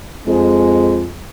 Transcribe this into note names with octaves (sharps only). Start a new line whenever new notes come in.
F2 G#3